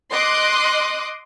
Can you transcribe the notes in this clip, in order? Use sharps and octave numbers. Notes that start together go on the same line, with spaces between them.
D#5 C6 D6 D#6 F#6